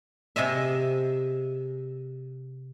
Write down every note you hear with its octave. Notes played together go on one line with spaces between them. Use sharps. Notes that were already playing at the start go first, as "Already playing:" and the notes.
C3 G#4 D#5 E5